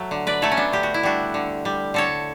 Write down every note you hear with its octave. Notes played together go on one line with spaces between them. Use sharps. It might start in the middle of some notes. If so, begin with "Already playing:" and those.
Already playing: F#3 A3
D3
B4 D5
F#3 A3 A4 C#5
C#4
B3 D4
D3 G4
F#4
E4
G3 D4 F#4
D3
G3
D3 A4 C#5